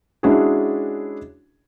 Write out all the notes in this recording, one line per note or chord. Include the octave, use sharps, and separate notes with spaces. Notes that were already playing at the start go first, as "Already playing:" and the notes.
G#3 C#4 D4 E4 F#4 G#4